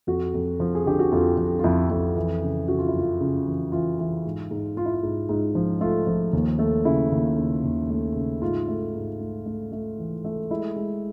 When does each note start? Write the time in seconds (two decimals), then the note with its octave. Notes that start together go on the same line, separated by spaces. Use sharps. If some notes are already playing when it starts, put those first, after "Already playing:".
0.07 F2 F#4
0.34 F2
0.60 F3
0.75 G#4
0.86 D3 G4
0.99 F#4
1.12 F2 F4
1.38 F2
1.59 F4
1.64 F2 E4
1.90 F2
2.16 E3
2.42 C#3
2.68 C#3 F#4
2.79 F4
2.88 E4
2.95 F#2 F4
3.20 C#3
3.46 E3
3.72 E3 F4
3.99 E3
4.25 G#2
4.51 G#2
4.77 G#2 F4
4.86 E4
4.94 F4
5.03 G#2
5.29 G#2
5.55 F3
5.81 A3 F4
6.07 F3
6.33 D#2
6.59 A3
6.85 C#3 E4
7.12 D#2
7.37 C#3
7.64 D#2
7.90 A3
8.16 C#3
8.42 G#2 F4
8.68 A3
8.94 G#2
9.20 A3
9.46 A3
9.72 A3
9.98 E3
10.25 A3
10.50 G#3 E4
10.76 G#3